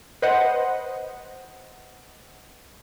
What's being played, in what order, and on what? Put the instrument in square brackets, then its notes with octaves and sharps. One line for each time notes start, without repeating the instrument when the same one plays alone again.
[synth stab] B4 C5 D#5 F#5